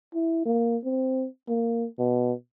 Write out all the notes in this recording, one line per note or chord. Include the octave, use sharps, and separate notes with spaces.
E4
A#3
C4
A#3
B2